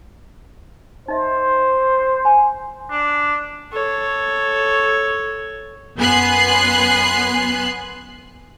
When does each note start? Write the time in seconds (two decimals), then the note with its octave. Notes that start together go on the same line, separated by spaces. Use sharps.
1.08 D#4 C5 D#5 E5
2.25 G#5
2.90 D4
3.73 A4 C#5
5.97 F#2 B3 G#5 C6 F#6 C7